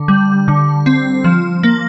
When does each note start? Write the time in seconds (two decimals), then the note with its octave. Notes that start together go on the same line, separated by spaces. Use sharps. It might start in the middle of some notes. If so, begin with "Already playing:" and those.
Already playing: D3
0.08 G3
0.48 D3
0.86 C4
1.24 F3
1.63 A#3